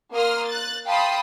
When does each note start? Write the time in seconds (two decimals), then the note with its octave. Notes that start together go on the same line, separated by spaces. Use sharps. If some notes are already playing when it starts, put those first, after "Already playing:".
0.13 A#3 A#4 C6 D#6 F6
0.48 F#6 A6
0.86 F5 G5 A5 B5 C6 D#6